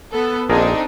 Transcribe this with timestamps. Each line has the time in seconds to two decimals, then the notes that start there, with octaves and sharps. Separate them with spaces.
0.12 B3 A4
0.50 A#1 C4 D4 D#4 G#4 A#4